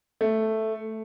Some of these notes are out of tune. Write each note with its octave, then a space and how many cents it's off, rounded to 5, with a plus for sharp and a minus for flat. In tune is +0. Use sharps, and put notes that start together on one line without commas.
A3 +0